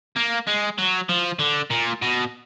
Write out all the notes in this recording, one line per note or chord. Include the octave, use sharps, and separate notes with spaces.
A#3
G#3
F#3
F3
D3
A#2
B2